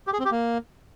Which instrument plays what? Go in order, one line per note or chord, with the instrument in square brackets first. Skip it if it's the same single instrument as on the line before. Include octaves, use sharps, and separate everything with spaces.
[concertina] G4
G#4
C4
G4
A#3